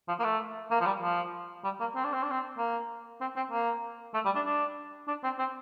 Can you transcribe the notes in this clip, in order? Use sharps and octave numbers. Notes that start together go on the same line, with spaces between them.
F3
A#3
A3
A#3
F3
G3
F3
G3
A#3
C4
D4
C4
D4
C4
A#3
C4
C4
A#3
A3
G3
D4
D4
D4
C4
C4